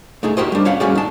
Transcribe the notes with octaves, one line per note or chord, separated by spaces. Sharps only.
A3 D#4 G#4
F#4 G4 A#4 C5 D#5
G3 D4
C#4 C#5 F5 F#5
G3 C#4 F#4 G#4 D5
D#4 A5